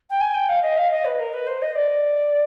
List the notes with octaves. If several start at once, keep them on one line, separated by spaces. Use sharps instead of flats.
G5
G#5
G5
F5
D#5
F5
D#5
B4
A#4
B4
C5
D#5
D5